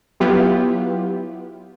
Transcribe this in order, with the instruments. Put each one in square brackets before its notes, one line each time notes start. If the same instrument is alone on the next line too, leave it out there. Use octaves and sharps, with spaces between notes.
[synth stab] F#3 B3 E4 F4 G4